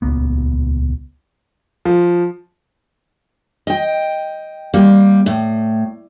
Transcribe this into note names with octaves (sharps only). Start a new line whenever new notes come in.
D#1 C#2 A#3 B3
F3
D#5 G5
G3 A#3
A2